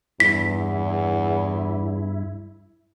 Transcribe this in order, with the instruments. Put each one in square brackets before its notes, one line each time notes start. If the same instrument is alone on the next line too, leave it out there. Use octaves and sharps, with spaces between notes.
[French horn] E2 [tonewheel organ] G2 E4 [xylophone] B6